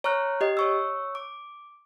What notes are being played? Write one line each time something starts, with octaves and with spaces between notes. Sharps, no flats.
C#5 A#5 C#6 F6 F#6
G4 D#5
C#5 C#6 E6
D6